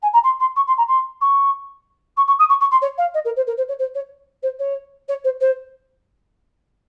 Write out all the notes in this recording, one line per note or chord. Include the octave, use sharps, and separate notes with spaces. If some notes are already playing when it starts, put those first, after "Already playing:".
G#5
A#5
C6
C6
C#6
C6
A#5
C6
C#6
C#6
C#6
D#6
C#6
C#6
C6
C#5
F5
D#5
A#4
C5
A#4
C5
C#5
C5
C#5
C5
C#5
C#5
C5
C5